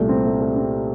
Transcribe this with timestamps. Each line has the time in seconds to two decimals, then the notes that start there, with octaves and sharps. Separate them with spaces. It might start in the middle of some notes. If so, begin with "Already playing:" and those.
Already playing: C2 A#2 A3
0.09 C4
0.25 A3
0.41 A3
0.56 C4